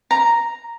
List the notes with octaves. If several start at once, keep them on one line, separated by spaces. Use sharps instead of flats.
A#5